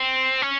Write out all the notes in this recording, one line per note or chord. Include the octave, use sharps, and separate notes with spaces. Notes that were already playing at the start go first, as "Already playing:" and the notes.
Already playing: C4
C#4